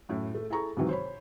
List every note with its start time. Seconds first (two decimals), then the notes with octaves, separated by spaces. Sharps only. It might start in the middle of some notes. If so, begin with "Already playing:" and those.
0.09 F#2 A2 E4
0.35 A3
0.50 E4 G#4 A4 A#5 C#6
0.77 G#2 C3 D#3 E3 F#3
0.89 C5 C#5 B5